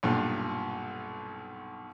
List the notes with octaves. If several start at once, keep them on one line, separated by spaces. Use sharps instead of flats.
B1 G2 A#2